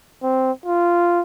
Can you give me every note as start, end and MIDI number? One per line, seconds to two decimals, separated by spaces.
0.23 0.52 60
0.66 1.22 65